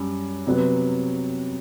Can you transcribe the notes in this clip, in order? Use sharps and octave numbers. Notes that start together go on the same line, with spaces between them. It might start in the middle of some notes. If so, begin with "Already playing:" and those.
Already playing: F#2 G3
C3 F#3 B3